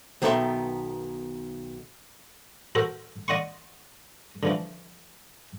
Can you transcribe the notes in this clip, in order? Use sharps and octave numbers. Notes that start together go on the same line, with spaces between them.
B1 D#3 B3 A4 E5 C6
F#4 A4 A#4 C5
D5 D#5 F#5 C6 C#6
D3 E3 F3